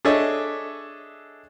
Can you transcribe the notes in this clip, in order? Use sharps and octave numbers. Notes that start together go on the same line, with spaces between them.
D4 G#4 A4 C#5 D#5 E5